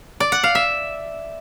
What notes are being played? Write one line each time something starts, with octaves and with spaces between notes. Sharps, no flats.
D5
F#5
F5
E5